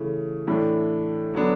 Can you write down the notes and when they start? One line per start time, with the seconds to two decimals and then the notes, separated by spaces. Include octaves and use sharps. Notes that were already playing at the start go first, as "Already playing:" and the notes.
Already playing: C#3 E3 A3
0.47 A2 E3 A3 D4
1.34 D3 F#3 B3 D4